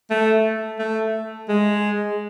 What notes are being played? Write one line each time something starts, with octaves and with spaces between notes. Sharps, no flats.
A3
A3
G#3